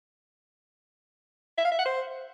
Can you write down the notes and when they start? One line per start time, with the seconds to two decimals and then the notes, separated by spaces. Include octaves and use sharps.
1.58 E5
1.65 F5
1.72 E5
1.79 F#5
1.86 C5